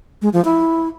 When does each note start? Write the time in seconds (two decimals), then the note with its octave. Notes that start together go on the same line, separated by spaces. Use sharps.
0.22 G#3
0.33 F3
0.45 E4